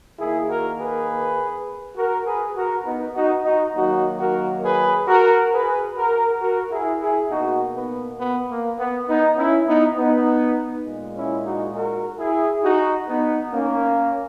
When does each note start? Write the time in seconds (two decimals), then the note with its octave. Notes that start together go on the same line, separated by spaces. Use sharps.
0.18 D#3 A#3 E4 G#4
0.49 F#4 A#4
0.78 G#4 B4
1.96 F#4 A#4
2.26 G#4 B4
2.56 F#4 A#4
2.85 B3 D#4
3.15 D#4 F#4
3.44 D#4 F#4
3.74 D#3 F#3 A#3 D#4 F#4
4.18 F#4 A#4
4.63 G#4 B4
5.07 F#4 A#4
5.52 G#4 B4
5.96 F#4 A#4
6.41 F#4 A#4
6.71 E4 G#4
7.00 E4 G#4
7.30 B2 A#3 D#4 F#4
7.74 B3
8.19 B3
8.49 A#3
8.78 B3
9.07 B3 D#4
9.37 C#4 E4
9.67 B3 D#4
9.96 B3 D#4
10.85 A#2 G#3
11.14 C#4 E4
11.44 D#4 F#4
11.74 F#4 A#4
12.18 E4 G#4
12.63 D#4 F#4
13.08 B3 D#4
13.52 A#3 C#4